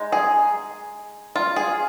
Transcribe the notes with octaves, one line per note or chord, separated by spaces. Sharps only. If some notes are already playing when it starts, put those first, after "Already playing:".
Already playing: G#3 D#4
G#4
F4
G#4